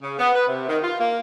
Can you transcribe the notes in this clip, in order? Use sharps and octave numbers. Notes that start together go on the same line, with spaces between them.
C#3
B3
B4
C3
D#3
F4
A#3